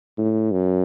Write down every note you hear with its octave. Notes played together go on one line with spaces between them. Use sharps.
A2
F#2